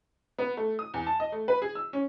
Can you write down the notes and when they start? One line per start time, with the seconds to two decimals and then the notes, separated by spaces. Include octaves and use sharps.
0.38 B3
0.57 A3
0.79 D#6
0.94 E2
1.06 A5
1.20 D#5
1.32 A3
1.48 B4
1.62 G#4
1.75 E6
1.93 C#4